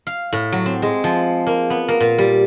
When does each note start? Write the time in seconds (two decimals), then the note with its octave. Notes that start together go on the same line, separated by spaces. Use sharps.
0.07 F5
0.33 A2
0.52 F#3
0.66 C4
0.82 G#3
1.04 F3
1.47 A#3
1.70 B3
1.88 A#3
2.00 A#2
2.18 G3